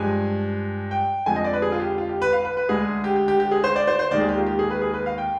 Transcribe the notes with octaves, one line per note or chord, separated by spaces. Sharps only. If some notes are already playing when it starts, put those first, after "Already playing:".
Already playing: G2 F3 G#3 G#5
G5
F2 D3 F3 G#3 G#5
D#5
D5
B4
G#4
F4
G4
F4
G4
B4
F5
B4
B4
D2 D3 G#3 G#4
G4
G4
G4
G4
G#4
C5
D5
C5
C5
D#2 D#3 G#3 D5
G#4
G4
F4
G4
G#4
B4
G#4
B4
F5
G5